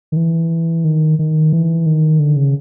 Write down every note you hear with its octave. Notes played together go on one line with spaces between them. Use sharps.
D#3
E3
D#3
D#3
E3
D#3
D3
C#3